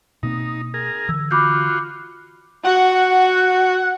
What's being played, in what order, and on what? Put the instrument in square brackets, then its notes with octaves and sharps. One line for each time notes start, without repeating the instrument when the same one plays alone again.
[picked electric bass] B2 A#3 C4 [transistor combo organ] D#4
[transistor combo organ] G#4 A#4
[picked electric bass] D3 E3 [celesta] E6
[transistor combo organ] F4 F#4 [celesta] B5 D6 G6
[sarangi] F#4 [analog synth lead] F#5